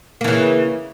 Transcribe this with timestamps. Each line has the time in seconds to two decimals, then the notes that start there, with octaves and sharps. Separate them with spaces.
0.21 A#3
0.24 E3
0.28 C#3